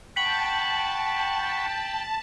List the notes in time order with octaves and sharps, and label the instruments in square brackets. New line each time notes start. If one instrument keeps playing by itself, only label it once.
[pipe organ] F#5 B5 C#6 [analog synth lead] G5 [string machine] A5 [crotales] B6 F#7